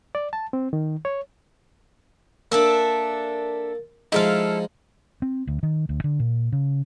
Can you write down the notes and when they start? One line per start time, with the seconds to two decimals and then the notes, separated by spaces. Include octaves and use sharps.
0.15 D5
0.33 A5
0.53 C4
0.73 D#3
1.05 C#5
2.52 A#3 D4 A4 E5
4.12 F3 G#3 D#4 E4 A4 F5
5.22 C4
5.47 D2
5.63 D#3
5.89 D2
6.04 D3
6.20 A#2
6.52 C#3